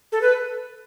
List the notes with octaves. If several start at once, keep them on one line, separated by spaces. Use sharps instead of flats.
A4
B4